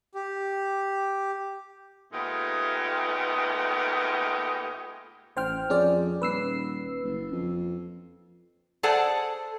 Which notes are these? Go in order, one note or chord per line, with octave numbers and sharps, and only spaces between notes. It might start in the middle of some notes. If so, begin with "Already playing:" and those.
G4
A#2 G#3 A3 B3 D#4 G4
A1 C5 G5 F6
F2 C#4 G#4 D5
D#1 B4 E6 C7
F#1
F2
G#4 A4 C5 D5 F#5 A5